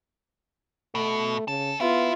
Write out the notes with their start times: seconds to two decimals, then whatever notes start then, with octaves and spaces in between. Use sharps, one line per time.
0.95 B2 A3
1.48 C#3 A4
1.81 B3 E4 F4